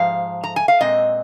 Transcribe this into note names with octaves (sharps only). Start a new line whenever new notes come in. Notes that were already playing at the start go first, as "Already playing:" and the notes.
Already playing: G#2 F3 F5
A#5
G#5
F5
A#2 G#3 C4 D#5